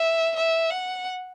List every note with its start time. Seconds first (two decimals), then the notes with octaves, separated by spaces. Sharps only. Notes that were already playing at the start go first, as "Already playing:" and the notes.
Already playing: E5
0.36 E5
0.71 F#5